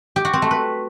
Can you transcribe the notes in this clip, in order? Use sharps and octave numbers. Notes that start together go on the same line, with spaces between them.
G4
F#4
C4
A3
B4